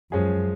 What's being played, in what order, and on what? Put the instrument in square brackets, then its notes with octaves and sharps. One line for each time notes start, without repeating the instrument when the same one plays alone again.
[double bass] F#2 [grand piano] F3 G#3 C#4 G#4